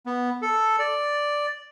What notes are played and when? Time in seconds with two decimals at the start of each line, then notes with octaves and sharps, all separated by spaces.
0.06 B3
0.42 A4
0.79 D5